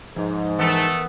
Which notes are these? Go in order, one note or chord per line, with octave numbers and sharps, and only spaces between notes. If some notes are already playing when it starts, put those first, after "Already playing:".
G#2 F3 D#4
E3 A3 B3 A4 A#4